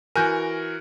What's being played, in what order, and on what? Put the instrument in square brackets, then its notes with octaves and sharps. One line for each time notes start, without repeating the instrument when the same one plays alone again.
[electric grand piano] E3 F#4 A#4 [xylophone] G#5 F#6 G6